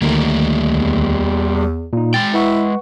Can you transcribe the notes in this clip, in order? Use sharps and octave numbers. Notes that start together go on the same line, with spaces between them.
D2 D#3 G3 A3 A#3
E2
A#2 D#4
G#3 G5 A6
E4 B4 F#5 C#6